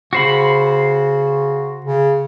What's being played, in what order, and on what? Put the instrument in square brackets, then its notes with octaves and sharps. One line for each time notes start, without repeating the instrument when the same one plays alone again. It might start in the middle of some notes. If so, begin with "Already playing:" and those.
[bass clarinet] C#3 [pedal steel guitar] F#4 C5 B5
[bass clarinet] C#3